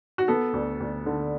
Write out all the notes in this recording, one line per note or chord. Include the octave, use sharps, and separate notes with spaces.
F#4
B3 A4
D2
D2
D3